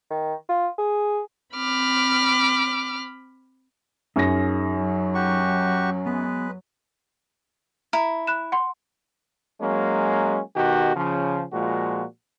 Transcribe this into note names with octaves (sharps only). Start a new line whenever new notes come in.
D#3
F4
G#4
C4 B5 D6 F6
F#2 D#4 G#4 C#5 A#6
F#3
F#4 G4 C#6
G#3 B3 B4
E4 A#5
B5 F#6 E7
F#5 C6
F#3 G#3 A#3 C#4
B2 D#3 F#4 G4
C#3 F3
A#2 F3 G#3 F#4